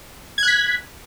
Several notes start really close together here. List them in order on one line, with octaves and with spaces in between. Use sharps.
G#6 F#6 B6